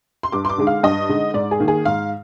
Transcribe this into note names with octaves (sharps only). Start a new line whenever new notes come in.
C6
G2 D6
C6
D6
D3 G#3 D#4
F5
G2 D#5
D3 G#3 D#4
G#2 D5
G#4
D#3 A#3 D#4
G#4
G#2 F5